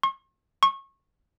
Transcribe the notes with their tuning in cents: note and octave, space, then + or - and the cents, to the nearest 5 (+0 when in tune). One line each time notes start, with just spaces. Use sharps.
C#6 -45
C#6 -25